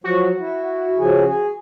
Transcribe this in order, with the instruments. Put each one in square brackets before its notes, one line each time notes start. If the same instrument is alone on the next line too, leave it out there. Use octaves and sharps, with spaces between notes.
[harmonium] F3 F#3 [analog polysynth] F#4
[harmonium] E4
C#3 F3 G#4
G#4